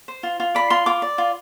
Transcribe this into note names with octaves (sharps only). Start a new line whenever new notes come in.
C5
F4
F4
D5 B5
F4 C6
F4 D6
D5
F4